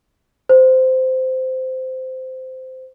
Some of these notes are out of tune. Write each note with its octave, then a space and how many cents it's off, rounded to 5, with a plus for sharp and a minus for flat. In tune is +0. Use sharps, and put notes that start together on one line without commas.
C5 -15